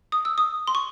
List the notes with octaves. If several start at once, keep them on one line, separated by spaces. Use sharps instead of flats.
D#6
E6
D#6
C6
C#6